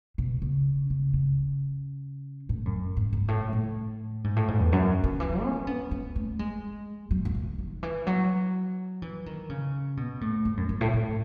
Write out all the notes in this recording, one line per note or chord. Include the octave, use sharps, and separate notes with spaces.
B2
C#3
C#3
C#3
A2
F#2
G#2
G#2
A2
A2
G#2
A2
G#2
E2
F#2
D#3
E3
C#4
B3
B3
A3
G#3
F#3
F#3
E3
D#3
E3
F#3
E3
D#3
C#3
B2
A2
G#2
F#2
F#2
A2
A2